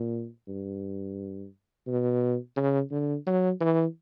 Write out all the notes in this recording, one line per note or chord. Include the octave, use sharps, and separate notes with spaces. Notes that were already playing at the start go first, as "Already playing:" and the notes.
Already playing: A#2
G2
B2
C#3
D3
F#3
E3